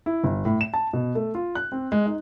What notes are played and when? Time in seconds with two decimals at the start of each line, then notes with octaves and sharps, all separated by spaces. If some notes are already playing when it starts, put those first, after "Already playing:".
0.06 E4
0.24 G1
0.45 A2
0.61 E7
0.74 A5
0.93 B2
1.15 A3
1.35 F4
1.55 F#6
1.72 C4
1.92 G#3
2.06 D#4